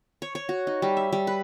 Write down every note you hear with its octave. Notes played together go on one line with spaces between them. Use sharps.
C#5
C#5
F#4
D#4
G3
E5
G3
B4